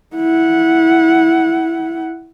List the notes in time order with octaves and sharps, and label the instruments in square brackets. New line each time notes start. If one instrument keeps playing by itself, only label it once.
[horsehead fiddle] E4 F#5